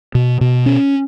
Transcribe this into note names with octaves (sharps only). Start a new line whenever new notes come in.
B2
B2
C#4